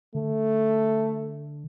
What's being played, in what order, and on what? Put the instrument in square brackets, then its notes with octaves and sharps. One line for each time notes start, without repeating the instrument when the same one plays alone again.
[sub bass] D3 [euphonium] A3